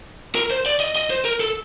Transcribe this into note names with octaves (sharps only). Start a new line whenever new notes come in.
A#4
C5
D5
D#5
D#5
C5
A#4
A4